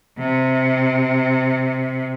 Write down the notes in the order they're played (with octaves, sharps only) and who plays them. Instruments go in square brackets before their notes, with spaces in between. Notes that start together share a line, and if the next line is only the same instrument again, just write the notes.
[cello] C3